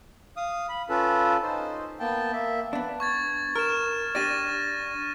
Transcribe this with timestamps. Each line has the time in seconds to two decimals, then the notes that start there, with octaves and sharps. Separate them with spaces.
0.37 F5 D#6
0.69 B5
0.89 C#4 F4 A4 B4
1.42 D#4 C5
2.00 A#3 B3 G5 A5
2.33 A#3 E5
2.73 B3 D4
3.00 C#6 G#6 A6
3.56 A#4 F6 E7
4.15 D4 G4 D5 A6 A#6 D#7